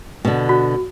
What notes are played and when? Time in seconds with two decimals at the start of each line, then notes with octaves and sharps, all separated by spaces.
0.25 B2 D3
0.49 F#4